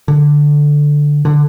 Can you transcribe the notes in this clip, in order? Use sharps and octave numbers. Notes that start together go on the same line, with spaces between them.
D3
D3